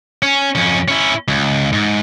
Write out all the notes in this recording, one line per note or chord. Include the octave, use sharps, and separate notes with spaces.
C#4
F2 C#4
C#4 E4
C#2
G#2